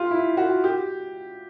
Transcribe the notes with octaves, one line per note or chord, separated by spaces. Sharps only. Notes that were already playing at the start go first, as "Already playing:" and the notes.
Already playing: F4 G4
E4
F#4
G4